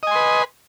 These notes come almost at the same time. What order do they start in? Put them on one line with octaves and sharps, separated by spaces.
D#5 G#5 C6 B4